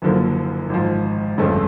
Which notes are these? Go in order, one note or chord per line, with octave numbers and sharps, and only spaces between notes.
F#1 F#2 D3 F3 A#3
G#1 G#2 F3
G1 F2 C#3 F3 A3